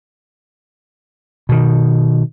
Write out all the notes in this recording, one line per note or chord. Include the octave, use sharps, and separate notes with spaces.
B2 D#3